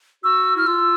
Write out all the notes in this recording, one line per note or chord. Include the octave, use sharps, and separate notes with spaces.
F#4 E6
E4 F6
F4 E6